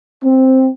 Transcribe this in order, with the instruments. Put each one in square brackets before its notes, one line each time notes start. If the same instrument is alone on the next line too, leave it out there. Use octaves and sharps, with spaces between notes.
[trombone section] C4